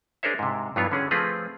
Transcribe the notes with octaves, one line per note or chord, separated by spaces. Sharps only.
D4 G#4 A#4 C5 C#5 E5
G#2 C3
G2 E3 F#3 B3 F4 C#5
D3 C#4 G#4
F3 A3 C4 F4 G#4 B4